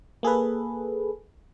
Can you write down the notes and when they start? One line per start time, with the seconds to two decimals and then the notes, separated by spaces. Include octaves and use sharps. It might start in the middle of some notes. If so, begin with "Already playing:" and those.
0.23 A#3 G#4 A4 B4